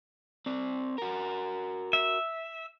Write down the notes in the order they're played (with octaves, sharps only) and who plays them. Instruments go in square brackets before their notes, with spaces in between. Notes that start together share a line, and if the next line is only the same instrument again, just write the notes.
[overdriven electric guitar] C4 D5
F#4 A#4
[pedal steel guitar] E5